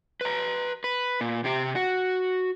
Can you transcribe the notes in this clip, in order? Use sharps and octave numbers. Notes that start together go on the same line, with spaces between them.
B4 A#5
B4
A#2
C3 G4
F#4